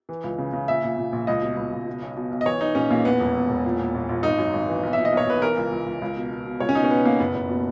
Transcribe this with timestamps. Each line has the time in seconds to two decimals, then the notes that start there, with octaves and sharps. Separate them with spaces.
0.09 E3
0.24 C#2
0.38 C#3
0.53 C#3
0.68 A#2 E5
0.84 A#2
0.98 A#2
1.13 A#1
1.27 C#2 D#5
1.42 B2
1.57 C#2
1.72 C#2
1.87 B2
2.02 B1
2.16 B2
2.31 B1
2.41 D#5
2.46 E3 C#5
2.61 E3 D#4
2.75 A#1 C#4
2.90 A#1 A#3
3.05 E2 B3
3.20 E1
3.35 E2
3.50 E1
3.65 A#2
3.79 A#2
3.94 A#1
4.09 A#1
4.23 G#1 D#4
4.38 F#2
4.53 G#1
4.68 E3
4.83 B1
4.93 A#2 E5
5.05 D#5
5.12 B1
5.17 C#5
5.27 B1 B4
5.41 E3 A#4
5.57 C#2
5.71 C#2
5.86 C#2
6.02 C#2
6.16 B2
6.31 B2
6.46 B2
6.60 C#2 C#5
6.69 C#4
6.75 B2 D#4
6.84 C#4
6.90 B2 B3
7.05 B2 A#3
7.19 F#1 B3
7.35 F#1
7.49 B2